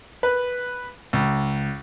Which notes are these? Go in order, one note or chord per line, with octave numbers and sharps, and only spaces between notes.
B4
C#2